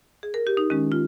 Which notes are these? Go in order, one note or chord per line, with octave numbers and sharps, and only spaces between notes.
G#4
A#4
G4
D#4
D#3 G#3 C#4
F4